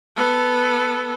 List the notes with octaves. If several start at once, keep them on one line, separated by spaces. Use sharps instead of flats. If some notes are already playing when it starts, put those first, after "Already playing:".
B3 A4